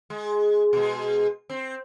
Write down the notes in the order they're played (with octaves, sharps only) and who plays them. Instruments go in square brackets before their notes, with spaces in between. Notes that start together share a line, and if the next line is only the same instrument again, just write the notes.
[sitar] G#3
B2 G#3
C4